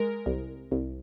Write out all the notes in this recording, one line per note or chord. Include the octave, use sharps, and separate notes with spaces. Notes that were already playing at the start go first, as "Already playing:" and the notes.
Already playing: G#3 A#4
C2
C2